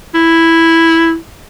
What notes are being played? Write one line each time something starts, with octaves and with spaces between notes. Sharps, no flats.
E4